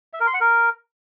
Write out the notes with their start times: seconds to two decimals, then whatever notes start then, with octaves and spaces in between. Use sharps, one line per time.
0.13 E5
0.20 A#4
0.27 C6
0.34 F#5
0.40 A#4